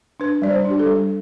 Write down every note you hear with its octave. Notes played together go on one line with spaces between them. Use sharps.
D4 B4
G3 D5
C5
D4
G4
A4
G3